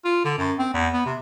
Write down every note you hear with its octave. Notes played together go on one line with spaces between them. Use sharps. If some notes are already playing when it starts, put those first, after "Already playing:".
F4
D3
F#2
C4
E2
B3
C3